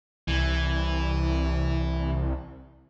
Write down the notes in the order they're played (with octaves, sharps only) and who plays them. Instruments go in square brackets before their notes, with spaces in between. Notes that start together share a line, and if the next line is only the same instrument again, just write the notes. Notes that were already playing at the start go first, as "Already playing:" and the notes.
[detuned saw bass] C2 [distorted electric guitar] E3